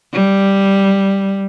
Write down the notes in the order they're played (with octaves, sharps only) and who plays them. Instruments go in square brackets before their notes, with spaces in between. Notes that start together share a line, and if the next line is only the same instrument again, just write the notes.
[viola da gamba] G3